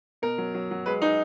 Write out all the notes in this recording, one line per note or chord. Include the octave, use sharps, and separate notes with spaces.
B2 A#4
F#3
F#3
F#3
G#3 B4
G#3 D#4